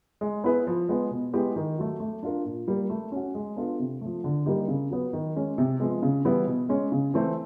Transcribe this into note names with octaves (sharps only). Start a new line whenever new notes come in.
G#3
B3 E4 G#4 B4
F3
G#3 B3
B2
G#3 B3 E4 G4
D#3
F#3 A3
A3
D4 F4 A#4
A#2
G3 A#3
A3
C#4 F#4
G#3
B3 D4 F4 A4
C3
F3 A3
D3
G3 A#3 D#4 G4
C#3
F#3 B3
D#3
G#3 C#4
C3
F3 G#3 B3
C#3
E3 G3 B3 E4
B2
G#3 C#4
C#3
E3 A3 C4